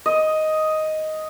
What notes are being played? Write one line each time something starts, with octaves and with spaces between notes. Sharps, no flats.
D#5